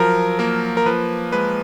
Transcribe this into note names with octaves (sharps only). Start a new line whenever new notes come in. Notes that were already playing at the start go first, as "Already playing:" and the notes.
Already playing: F3 F#3 A#4
A#3 A#4
A#4
F3 B4
G#3 B4